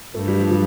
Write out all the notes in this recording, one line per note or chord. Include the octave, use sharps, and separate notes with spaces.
G2 A3
G3
F3
G3